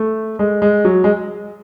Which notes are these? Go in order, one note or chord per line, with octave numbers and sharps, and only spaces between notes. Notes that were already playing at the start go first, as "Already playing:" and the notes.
Already playing: A3
G#3
G#3
F#3
G#3